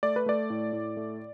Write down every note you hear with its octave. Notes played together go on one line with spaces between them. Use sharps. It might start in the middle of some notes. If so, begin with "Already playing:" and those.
A3 D5
B4
A3 D5
A2
A2
A3